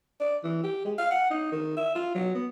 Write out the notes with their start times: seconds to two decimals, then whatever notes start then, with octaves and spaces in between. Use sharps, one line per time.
0.20 D5
0.44 E3
0.63 G4
0.85 G#3
0.98 F5
1.11 F#5
1.30 D#4
1.52 D#3
1.76 E5
1.95 F4
2.15 F#3
2.35 B3